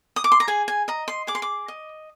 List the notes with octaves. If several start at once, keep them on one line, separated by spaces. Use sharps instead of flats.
D#6
D6
C6
A#5
G#4 G#5
G#5
D#5 A#5
C6
G#4 D6
C6
D6
D#5